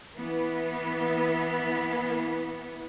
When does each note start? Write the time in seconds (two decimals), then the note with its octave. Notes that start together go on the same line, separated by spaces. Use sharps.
0.15 E3 B3